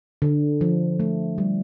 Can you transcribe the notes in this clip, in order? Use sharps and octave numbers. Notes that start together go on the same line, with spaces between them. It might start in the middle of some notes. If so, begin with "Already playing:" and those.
D3
F3
A3
G3